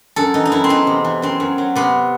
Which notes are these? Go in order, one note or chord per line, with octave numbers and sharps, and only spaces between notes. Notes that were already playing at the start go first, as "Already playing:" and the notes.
F#2 A4
E3 D#4
D#4
F#2 E4
C4
E2 D#4
C3
E3
F#2 C4
F#2
F#3
C3 B3